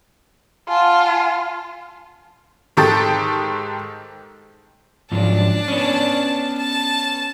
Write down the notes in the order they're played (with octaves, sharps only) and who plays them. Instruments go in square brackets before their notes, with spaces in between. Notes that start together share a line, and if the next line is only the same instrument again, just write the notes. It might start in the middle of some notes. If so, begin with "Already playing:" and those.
[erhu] F4 [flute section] F#5 G#5 A5
[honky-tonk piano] G#2 D#3 G4 A4 A6
[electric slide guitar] G#2 F3 F#3 [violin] D4 A5
[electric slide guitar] B3 C#4
[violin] A5